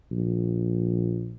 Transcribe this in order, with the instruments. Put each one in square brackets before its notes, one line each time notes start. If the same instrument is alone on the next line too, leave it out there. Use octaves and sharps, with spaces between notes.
[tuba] A#1